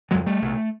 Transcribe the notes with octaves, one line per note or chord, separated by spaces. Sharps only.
F2 C#3 F#3 G#3
G3 A3
C2 B2